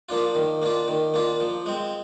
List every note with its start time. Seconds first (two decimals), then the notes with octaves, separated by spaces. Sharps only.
0.09 F3 A#3 D4 F4
0.35 D#3
0.62 A#3 D4 F4
0.88 D#3
1.14 A#3 D4 F4
1.40 F3
1.66 G#3 C4